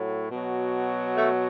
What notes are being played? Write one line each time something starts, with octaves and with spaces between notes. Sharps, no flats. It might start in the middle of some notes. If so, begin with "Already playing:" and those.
Already playing: A2 F#3
B2 F#3
A3